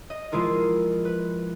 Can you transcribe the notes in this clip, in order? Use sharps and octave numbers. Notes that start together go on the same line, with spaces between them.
D#5
F3 G#3 E4 F4 A#4
B4